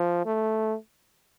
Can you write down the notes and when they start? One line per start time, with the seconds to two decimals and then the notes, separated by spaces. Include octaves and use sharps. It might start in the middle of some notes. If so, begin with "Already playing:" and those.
Already playing: F3
0.26 A3